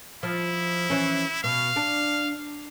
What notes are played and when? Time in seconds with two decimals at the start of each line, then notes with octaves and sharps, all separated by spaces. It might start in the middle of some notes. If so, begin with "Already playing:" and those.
0.23 F3 E4
0.90 E3 C#4
1.44 B2 F5
1.76 D4